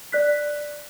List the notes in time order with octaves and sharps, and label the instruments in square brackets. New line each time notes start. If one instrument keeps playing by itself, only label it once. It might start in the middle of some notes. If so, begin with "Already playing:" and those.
[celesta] D5 F#6 B6